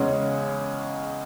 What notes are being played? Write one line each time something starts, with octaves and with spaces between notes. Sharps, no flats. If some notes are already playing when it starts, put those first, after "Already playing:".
Already playing: E2 C#3 G#3 C#4